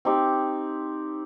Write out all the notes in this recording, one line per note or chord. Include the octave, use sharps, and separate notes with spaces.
C4 D#4 G4